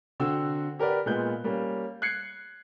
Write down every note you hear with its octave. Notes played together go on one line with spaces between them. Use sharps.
D3 C4 F#4 G5 E6
G4 A#4 B4 D5 F#5
A#2 G#3 B3 F4 F#6 G6
G3 A#3 C#4
F#6 G#6 C7 C#7